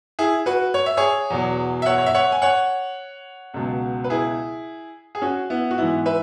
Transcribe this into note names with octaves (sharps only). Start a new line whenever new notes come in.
E4 G#4
F#4 B4
C#5
E5
G#4 C#5
E2 B2 F#3
E5
C#5 F#5
C#5
E5
C#5 F#5
G#5
C#5 F#5
C#2 B2 F#3
B4
E4 G#4
G#4
C#4 F#4
B3 E4
F#4
G#2 E3 B3 E4
B4 E5